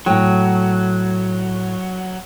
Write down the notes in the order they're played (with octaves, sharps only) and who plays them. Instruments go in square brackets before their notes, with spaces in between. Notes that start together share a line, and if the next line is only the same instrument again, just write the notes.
[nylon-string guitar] A2 G5 [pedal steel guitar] F#3